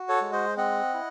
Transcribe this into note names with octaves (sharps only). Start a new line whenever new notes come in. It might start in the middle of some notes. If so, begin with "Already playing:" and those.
Already playing: F#4
A4 C#5
G#3
C5 D#5
C4 D#5 F#5
E4